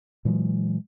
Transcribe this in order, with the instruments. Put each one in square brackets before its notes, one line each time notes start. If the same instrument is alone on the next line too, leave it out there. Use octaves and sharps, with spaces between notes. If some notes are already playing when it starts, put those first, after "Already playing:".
[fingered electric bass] A#2 E3 F#3 G#3